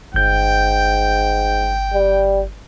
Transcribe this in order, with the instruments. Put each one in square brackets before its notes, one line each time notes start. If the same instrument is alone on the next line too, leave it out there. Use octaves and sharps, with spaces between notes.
[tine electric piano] G1 G6 [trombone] G#2 [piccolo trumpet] G5
[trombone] G3